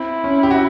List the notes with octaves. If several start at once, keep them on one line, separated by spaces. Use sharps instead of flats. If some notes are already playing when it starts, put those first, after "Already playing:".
Already playing: C4 E4
C#4
G4
F#4